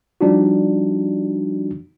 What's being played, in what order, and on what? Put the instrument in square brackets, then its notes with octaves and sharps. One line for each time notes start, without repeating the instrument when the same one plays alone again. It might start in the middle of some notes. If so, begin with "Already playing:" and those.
[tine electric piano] F3 G3 D4 D#4 F#4